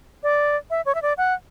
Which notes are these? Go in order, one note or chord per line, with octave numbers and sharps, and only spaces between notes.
D5
E5
C#5
E5
D5
F#5